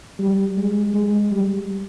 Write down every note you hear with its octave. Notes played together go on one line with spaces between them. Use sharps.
G3
G#3
G#3
G3